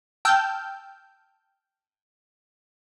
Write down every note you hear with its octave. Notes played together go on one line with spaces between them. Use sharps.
G5 A5 E6 F6 G6